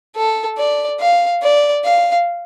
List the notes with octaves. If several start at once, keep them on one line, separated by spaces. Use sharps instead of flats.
A4
D5
F5
D5
F5